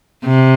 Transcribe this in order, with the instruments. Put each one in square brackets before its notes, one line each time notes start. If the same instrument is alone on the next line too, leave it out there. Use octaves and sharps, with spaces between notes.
[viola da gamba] C3